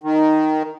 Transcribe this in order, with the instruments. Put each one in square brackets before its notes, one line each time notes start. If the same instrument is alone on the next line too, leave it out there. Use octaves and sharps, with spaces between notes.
[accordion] D#3